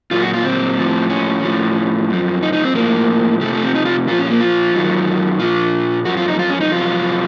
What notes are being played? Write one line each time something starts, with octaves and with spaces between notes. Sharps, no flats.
A#2 F#3 F4
F#4
F4
C4
A2 F3
C#4
A2 F3
F#2 F3
D#4
D#4
C4
A2 F3 A#3
F2 C3 F3 A3
A3
C4
D#4
F4
A#2 F3 F4
C#4
A#3
F4
F#2 D#3 F#3
A#2 F3 F4
F#2 F3 F#4
F4
D#4
F4
C#4
D#4
F2 C3 F#3 F4